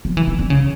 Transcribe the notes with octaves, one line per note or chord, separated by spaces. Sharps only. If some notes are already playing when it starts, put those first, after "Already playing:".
F3
E3
D#3
D3
C#3